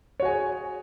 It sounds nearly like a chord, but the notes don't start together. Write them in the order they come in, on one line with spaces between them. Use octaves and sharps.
C#5 F#4 G#5 G#4